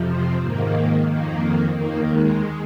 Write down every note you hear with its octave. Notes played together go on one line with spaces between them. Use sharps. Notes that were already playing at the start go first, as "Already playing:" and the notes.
Already playing: F2 C3 F3
C4
G#2 D#3 A#3
F2 D#3 A#3
D#2 D#3 A#3
G#3